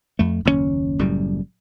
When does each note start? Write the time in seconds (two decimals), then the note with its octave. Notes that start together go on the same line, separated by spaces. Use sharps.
0.19 F2 A3
0.45 F#1 D#2 C#3 C#4
0.99 F#1 F#2 A2 G3